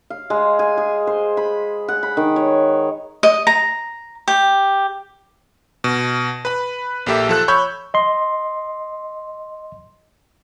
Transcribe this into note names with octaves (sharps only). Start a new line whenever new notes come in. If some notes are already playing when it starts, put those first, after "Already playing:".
F5
G#3
G#5
G#4
C5
B5
F#5
B5
D#3
C#5
D#5
A#5
G4
B2
B4 B5
A#1 A#3 G4 A4 E5
F3 A4 F#6
C#5 B5 C#6 E6 G6
D#5 C6